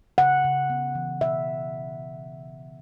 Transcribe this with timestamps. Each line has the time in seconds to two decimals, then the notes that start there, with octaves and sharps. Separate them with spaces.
0.18 C#3 F#5
0.44 C#3
0.70 B3
0.95 E3
1.21 B2 E5